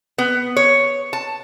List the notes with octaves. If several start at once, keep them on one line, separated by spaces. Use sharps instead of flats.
B3
C#5
A5